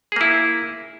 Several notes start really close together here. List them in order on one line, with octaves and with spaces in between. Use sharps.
G#4 A#3 E4